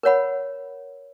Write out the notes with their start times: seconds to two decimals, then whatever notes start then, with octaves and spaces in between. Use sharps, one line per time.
0.03 A#4 C#5 F#5 B5